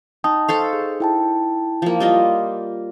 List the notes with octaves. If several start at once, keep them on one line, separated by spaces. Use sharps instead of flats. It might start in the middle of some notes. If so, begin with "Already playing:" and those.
D#4 G5 A5 D#6
A4 C5 F5 C#6
G#4
E4 G5 A5
F3 A#3
G3 F4 D#5